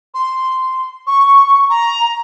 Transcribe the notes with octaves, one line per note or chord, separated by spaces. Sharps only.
C6
C#6
A#5